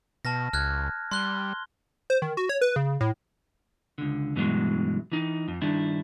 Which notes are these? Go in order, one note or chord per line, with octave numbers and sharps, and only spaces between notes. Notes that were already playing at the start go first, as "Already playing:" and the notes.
B2 A5 F6 A#6
C#2 F6 F#6 G#6
G3 C6 F#6 G7
C5
D#3
F#4
C#5
B4
C#3
A2
C#2 D3
G2 B2 E3 F#3 G#3
E3 D#4
F2
G2 D#3 D4 E4